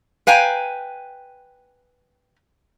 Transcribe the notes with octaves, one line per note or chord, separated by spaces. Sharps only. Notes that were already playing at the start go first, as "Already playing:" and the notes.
B4 F5 G5 G#5 A#5